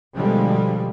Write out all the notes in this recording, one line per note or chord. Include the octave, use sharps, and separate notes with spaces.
B2 D3 F3 G3 G#3